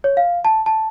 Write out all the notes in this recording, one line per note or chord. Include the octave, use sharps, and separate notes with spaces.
C#5
F5
A5
A5